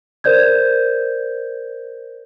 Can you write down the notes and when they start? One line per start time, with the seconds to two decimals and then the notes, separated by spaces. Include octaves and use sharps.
0.24 A#4 C5 D5 G6 G#6